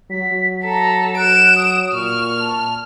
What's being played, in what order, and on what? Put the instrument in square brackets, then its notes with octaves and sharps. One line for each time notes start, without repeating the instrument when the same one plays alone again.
[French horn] F#3 [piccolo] B6
[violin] A4 [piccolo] A#5
[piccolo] F#6 [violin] D7 E7
[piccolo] D#6
[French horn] A#2 [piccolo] C#6 [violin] F6
[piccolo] A5